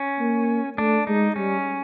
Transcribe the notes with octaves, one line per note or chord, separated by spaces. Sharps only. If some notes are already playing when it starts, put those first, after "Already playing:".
Already playing: C#4
A#3
A3 D4
G#3 D#4
G3 C#4